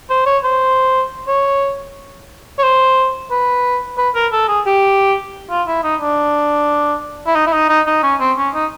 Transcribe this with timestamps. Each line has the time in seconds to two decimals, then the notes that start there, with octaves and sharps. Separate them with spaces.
0.10 C5
0.26 C#5
0.44 C5
1.28 C#5
2.59 C#5
2.63 C5
3.31 B4
3.98 B4
4.15 A#4
4.32 A4
4.48 G#4
4.66 G4
5.51 F4
5.67 E4
5.84 D#4
6.01 D4
7.27 E4
7.36 D#4
7.47 E4
7.53 D#4
7.69 D#4
7.87 D#4
8.03 C#4
8.20 C4
8.38 C#4
8.55 D#4